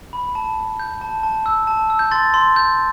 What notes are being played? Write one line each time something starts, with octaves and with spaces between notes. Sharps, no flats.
B5
A5
A5
G6
A5
A5
E6
A5
E6
G6
C6 A6
C6
G6